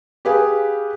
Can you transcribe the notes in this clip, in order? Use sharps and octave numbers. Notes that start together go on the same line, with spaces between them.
G4 G#4 B4 F5 G#5